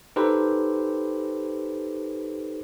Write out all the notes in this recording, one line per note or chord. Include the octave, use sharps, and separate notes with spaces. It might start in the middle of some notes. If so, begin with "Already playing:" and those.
D#4 G4 A4 B4 C5